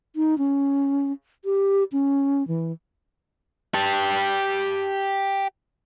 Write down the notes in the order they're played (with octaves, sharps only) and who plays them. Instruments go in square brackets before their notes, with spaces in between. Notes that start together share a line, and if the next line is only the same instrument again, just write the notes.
[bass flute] D#4
C#4
G4
C#4
E3
[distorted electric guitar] G4 A5